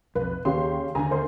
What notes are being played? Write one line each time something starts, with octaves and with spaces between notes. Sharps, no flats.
B1 F2 B4
D#2 C#3 G4 C6
D#2 D3 D4 G#5 A#5
A#4 C5 C6